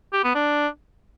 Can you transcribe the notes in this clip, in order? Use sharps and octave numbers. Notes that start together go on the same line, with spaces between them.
G4
B3
D4